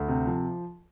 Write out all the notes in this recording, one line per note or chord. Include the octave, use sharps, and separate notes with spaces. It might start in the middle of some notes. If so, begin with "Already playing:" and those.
Already playing: D2
C3
F3